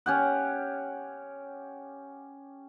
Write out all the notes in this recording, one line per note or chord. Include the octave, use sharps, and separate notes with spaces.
C#4 G4 F#5